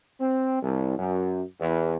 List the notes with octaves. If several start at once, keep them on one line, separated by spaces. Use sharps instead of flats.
C4
C2
F#2
E2